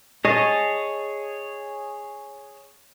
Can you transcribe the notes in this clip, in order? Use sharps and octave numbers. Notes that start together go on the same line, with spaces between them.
G#4 C#5 D#5 A5